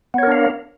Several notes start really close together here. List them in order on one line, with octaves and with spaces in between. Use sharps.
B3 C#5 A#4 D4 F5